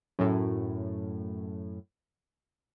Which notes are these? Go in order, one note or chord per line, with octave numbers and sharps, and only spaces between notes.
F#2 A2